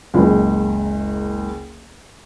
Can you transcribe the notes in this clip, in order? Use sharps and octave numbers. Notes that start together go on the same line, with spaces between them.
F#1 C#2